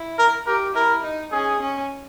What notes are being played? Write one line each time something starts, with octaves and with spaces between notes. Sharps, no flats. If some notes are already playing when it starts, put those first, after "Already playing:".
Already playing: E4
A#4
G4 A#4
E4 A#4
D#4
C#4 G#4
C#4